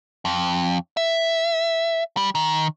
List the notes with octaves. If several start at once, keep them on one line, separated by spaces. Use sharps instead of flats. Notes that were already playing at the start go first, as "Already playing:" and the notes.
F2
E5
G3
D#3